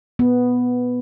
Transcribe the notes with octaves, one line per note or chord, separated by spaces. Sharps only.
B3